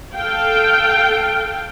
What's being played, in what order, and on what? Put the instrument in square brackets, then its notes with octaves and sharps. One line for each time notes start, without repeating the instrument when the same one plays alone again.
[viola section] A4 F5 G5